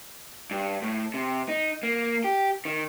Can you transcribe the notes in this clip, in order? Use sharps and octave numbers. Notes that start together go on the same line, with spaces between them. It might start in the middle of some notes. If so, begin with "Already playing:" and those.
G2
A2
C3
D#4
A#3
G4
D#3